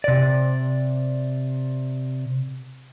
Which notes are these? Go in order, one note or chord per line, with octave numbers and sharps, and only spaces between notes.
C3 D5